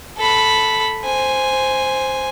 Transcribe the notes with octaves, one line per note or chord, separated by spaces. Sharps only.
A4 B5
C5 G#5